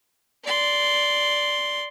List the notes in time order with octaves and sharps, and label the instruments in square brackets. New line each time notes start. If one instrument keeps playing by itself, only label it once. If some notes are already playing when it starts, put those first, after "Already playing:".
[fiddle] D5 C6